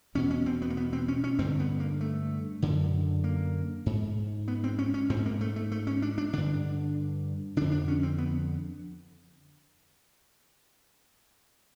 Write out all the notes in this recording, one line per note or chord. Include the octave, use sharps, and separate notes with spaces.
E2 B2 C#4
C#4
C4
B3
A#3
B3
C4
C#4
C#4
G2 D3 C4
B3
A#3
A3
F#2 D3
A#3
G#2
B3
C4
C#4
C#4
G#2 C4
A#3
A3
A3
A3
C#4
D4
D4
G2 D3 D4
F2 D3 D4
D4
C#4
C4
B3